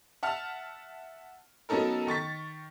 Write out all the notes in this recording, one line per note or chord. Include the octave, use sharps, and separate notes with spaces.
E5 F#5 A5 F6
F#3 B3 C#4 D#4 A4 A#4
D#3 C#6 A6 B6